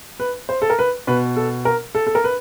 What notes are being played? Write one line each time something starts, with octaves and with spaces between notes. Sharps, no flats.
B4
C5
A4
A#4
B4
B2 B4
A4
A#4
A4
A4
A#4
B4